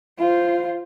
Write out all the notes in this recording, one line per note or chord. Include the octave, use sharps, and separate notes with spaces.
F4 C5